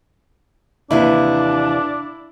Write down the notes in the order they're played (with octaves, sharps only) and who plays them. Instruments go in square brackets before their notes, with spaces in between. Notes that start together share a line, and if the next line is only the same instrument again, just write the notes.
[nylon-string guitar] D#2 C3 E3 [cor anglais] D4 [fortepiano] E4